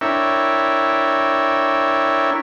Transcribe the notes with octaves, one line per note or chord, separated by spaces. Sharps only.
D4 E4 A#4 C#5 E5 G5